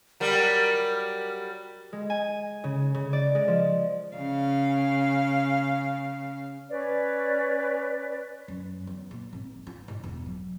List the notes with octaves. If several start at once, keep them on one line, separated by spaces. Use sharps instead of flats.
F#3 G3 A#4
G#3
G#5
C#3
C#3
D5
G#3
F3
C#3 F5
C#4 B4 C#5 D5
F#2
E2
A#2
G#1
F4
G#2
E1
F#3